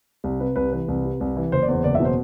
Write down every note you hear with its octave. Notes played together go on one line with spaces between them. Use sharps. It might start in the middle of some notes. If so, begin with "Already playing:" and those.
C2
C3 B4
C2 B4
E3 B4
C2
C3
C2
E3
F#1 C5
D5
E2 C5
F#1 D5
E5
B2
C5